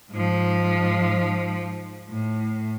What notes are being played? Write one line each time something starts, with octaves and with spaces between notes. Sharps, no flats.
G#2 F3
A2